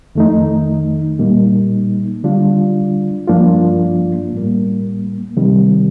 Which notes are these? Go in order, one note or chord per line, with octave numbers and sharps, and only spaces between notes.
F2 D#3 A3 D#4
A#2 G3 A#3 D#4
D3 G3 D4 F4
G2 F3 A#3 D4 F4
A2 G3 A#3
C3 D#3 G3